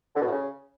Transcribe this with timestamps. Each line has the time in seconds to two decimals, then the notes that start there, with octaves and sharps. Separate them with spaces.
0.14 D3
0.20 B2
0.26 A2
0.31 C#3